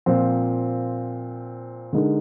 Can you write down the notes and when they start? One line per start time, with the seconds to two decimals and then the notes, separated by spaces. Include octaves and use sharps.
0.06 A#2 F3 C4
1.93 D3 G#3 D#4 A#4